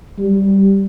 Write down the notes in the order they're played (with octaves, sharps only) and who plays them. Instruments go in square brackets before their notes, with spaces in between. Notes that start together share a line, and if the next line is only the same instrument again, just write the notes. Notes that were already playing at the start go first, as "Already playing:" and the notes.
[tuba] G3